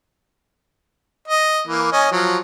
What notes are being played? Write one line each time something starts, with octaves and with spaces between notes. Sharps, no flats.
D#5
E3 A#3
C#4 D#5 G#5
F3 F#3